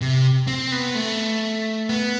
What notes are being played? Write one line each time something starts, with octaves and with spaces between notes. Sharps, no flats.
C3
C4
B3
A3
B3